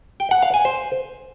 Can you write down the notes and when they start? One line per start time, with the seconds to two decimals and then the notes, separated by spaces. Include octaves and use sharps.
0.20 G5
0.31 F#5
0.42 F5
0.54 G#5
0.65 C5